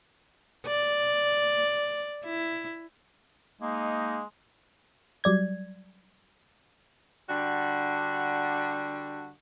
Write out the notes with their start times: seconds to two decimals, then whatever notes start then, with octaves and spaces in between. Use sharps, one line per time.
0.67 D5
2.24 E4
3.62 G#3 A#3 D#4
5.24 F#3 G3 D5 G#6
7.29 D3 G3 D4 F#4